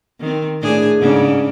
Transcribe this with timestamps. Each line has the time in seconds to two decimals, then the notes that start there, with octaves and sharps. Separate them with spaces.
0.20 D#3 C4
0.62 A2 D4 G#4
0.99 G#2 C#3 D4